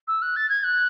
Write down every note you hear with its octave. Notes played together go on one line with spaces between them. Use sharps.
E6
F#6
A6
G#6
F#6